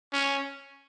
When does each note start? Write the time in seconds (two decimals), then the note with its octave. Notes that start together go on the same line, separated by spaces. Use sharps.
0.13 C#4